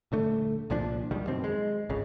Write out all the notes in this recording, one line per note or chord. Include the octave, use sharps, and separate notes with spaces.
D#1 D3 A3
C2 A#2 F3 D4
C#2 D#3 G3
F#2 B2 C4
G#3
G#1 C#2 C#3